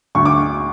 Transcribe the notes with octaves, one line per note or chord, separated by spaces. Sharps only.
D2 D3 C#6
D6